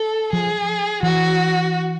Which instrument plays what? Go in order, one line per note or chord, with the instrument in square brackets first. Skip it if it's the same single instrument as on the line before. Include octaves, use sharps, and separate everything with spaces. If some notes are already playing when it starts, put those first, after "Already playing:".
Already playing: [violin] A4
[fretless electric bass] F3 [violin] G#4
[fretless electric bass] E3 [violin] F#4